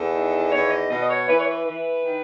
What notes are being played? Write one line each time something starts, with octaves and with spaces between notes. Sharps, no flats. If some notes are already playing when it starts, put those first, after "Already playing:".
Already playing: E2 A4
D#3
E2 C#5
D#5
B2 D#5
D#5
C#5
E3 B4
C#5
B4
E3
D#3